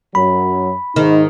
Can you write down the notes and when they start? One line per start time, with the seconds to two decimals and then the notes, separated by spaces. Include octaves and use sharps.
0.15 F#2 F#3 B5
0.96 G#2 D#3 D#4